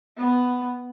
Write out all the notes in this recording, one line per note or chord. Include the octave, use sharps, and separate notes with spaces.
B3